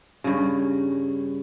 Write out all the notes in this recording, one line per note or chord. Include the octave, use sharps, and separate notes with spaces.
G2 C#3